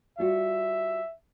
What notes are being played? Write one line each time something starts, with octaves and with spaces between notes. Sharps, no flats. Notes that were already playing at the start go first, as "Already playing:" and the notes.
G3 F4 F#4 E5